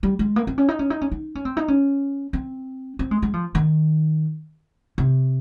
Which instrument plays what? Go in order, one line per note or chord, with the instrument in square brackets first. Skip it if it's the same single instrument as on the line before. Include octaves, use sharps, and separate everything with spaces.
[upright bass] G3
G#3
A#3
C4
C#4
D#4
C#4
D#4
C#4
D#4
C#4
C4
D#4
C#4
C4
C4
G#3
G#3
F3
D#3
C3